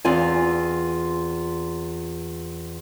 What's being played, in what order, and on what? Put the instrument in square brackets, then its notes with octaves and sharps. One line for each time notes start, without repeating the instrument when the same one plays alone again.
[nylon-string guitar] E2 C4 F4 D5 G#5